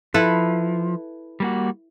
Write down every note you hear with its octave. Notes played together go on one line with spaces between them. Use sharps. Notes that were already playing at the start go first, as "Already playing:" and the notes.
F3 E4 A4 B4
G3 A#3 F#4